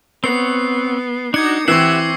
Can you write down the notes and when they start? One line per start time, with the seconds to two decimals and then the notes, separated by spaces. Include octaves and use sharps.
0.24 B3 C4 C#5 F#5 C7
1.34 D4 D#4 F#4 D6 G#6 C#7
1.68 E3 C4 G4 E5 F#5 C#6 E6 C7